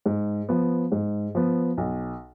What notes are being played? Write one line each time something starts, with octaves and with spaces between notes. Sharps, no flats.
G#2
F3 B3
G#2
F3 B3
B1